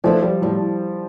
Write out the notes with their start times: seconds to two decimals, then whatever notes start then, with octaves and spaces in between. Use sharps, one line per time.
0.04 E3 F3 A3 D4
0.22 G3
0.42 A2 G3